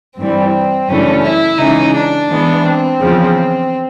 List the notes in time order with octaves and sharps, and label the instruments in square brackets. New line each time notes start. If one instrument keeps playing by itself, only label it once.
[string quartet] G2 E3 G3 [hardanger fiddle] C4
[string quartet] F#2 C#3 E3 A3 D4 [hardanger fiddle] C#4
[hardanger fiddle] E4
[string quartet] C#3 E3 G#3 C#4 [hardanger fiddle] D#4
[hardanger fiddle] D4
[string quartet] E3 G#3 B3
[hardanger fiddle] C4
[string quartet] E2 C#3 F3